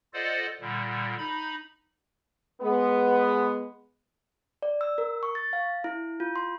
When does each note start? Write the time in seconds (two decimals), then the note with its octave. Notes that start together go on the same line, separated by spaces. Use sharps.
0.14 F4 A4 C5 D5 D#5 F#5
0.61 A#2 D3 G3
1.18 D#4 B5
2.61 G#3 B3
4.62 D5
4.81 E6
4.98 A#4
5.23 C#6
5.35 A6
5.53 F5
5.84 E4
6.20 F4
6.36 C6